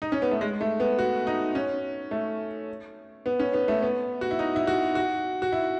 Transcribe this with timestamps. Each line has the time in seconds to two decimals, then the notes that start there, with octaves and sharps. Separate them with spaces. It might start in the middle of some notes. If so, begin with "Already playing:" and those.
0.02 D#4
0.12 C#4
0.22 B3
0.31 A3
0.41 G#3
0.61 A3
0.80 B3
0.99 F#4
1.27 D#4
1.55 C#4
2.11 A3
3.26 B3
3.39 C#4
3.53 B3
3.68 A3
3.82 B3
4.21 F#4
4.31 E4
4.39 D#4
4.56 E4
4.67 F#4
4.95 F#4
5.42 F#4
5.52 E4